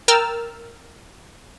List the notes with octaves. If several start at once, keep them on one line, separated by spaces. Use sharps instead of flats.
A#4 G5 E6 F6 A6